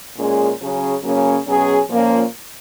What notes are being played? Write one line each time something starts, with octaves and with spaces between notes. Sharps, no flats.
A#2 G#3 C#4 G#4
C#3 F#3 C#4 G#4
C#3 F#3 A#3 C#4
B2 F#3 C#4 G#4
A#2 F3 A#3 C#4